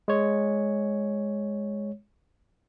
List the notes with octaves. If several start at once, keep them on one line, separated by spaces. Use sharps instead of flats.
G#3 C#5